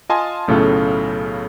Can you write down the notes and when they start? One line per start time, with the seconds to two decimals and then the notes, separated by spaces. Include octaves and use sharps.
0.09 F4 D#5 G#5 A5 C6 D#6
0.48 B1 A2 C#3 A3 F4 A4